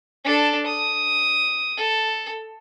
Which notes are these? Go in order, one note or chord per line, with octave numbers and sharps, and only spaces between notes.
D4 A4
D#6
A4